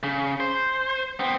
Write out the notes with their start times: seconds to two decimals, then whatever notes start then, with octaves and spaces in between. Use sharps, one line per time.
0.03 C#3
0.40 C5
1.20 B3 C4